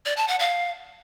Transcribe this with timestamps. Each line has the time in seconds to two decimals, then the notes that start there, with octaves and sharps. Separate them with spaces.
0.06 D5
0.17 A5
0.28 F#5
0.39 F5